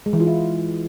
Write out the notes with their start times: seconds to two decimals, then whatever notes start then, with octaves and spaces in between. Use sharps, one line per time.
0.06 G#3
0.13 E3
0.20 F4
0.27 E4